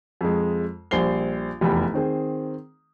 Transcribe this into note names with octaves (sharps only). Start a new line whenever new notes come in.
F2 G#3
A#1 G3 C5 C7 G7
F1 E2 G4 B5
D#3 C4 G#4